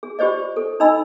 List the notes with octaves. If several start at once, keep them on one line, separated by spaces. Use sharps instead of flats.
G#4
F4 G4 C5 D5 D#5
A4
D4 D#4 D#5 B5 E6